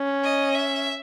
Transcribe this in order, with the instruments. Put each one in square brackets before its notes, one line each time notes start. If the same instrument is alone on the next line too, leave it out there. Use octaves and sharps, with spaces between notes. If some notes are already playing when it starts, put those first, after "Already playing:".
Already playing: [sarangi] C#4
[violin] D#5
E5